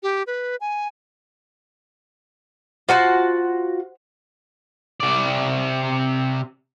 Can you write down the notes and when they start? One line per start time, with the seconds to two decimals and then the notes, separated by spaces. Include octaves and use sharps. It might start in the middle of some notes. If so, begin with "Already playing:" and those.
0.03 G4
0.27 B4
0.61 G#5
2.89 F4 F#4 C5 F#5 A5
5.00 C3 D5